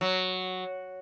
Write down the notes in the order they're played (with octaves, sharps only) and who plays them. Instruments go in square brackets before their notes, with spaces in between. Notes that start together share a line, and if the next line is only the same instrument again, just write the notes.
[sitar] F#3